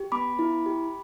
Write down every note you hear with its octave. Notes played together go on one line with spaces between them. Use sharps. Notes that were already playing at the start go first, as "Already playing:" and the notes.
Already playing: G4
B3 B5 D6
E4
G4